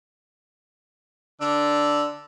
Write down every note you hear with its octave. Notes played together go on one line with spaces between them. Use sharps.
D3 D4 E6